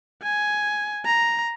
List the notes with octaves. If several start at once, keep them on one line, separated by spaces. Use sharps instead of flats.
G#5
A#5